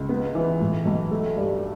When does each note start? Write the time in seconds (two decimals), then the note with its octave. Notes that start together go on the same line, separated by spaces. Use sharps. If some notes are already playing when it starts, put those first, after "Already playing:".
Already playing: C#2
0.09 B3
0.35 E3
0.60 A2
0.85 B1
1.11 A3
1.37 G2